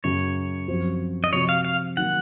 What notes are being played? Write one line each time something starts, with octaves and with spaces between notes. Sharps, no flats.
F#2 C#3 F#3 C#5
F#2 F3 C4 F#4 C5
D#5
C3 F3 C4 F#4 C#5
F5
F5
D#3 F#3 A#3 F#5